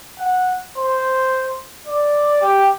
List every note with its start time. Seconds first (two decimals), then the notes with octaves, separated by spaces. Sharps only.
0.18 F#5
0.77 C5
1.87 D5
2.41 G4